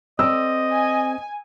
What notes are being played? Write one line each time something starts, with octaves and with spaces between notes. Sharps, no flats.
C4 A4 D5 D#5 E6
G#5